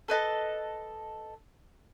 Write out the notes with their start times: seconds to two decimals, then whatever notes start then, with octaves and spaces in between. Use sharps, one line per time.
0.08 A4 B4 D#5 A5